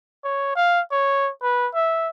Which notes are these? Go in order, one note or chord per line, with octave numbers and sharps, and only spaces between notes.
C#5
F5
C#5
B4
E5